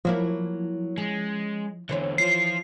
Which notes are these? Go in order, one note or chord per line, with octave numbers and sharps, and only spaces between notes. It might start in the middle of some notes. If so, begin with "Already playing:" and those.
F3 F#3 A#3 E4
G#3 C#4
E2 D3 E3 C5 C#5
F3 F4 C7